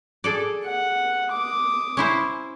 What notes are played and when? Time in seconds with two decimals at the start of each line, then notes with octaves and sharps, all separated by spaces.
0.24 G#4 A4 D5
0.64 F#5
1.31 D6 D#6
1.97 C#4 E4 C5